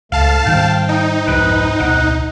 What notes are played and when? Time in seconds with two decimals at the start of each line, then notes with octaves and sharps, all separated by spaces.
0.12 C#2 G#2 A3 F5 A5
0.46 G#2 D#3 G3 C4 G5
0.89 D#4
1.27 C2 F2 G#2 B4
1.79 D1 B1 F#5